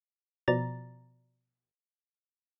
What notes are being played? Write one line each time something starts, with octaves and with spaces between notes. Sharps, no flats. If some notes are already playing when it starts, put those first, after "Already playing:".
B2 F3 D5 A#5 A6